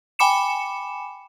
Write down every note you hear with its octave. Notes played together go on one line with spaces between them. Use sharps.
G5 G#5 B5 D6 C#7 E7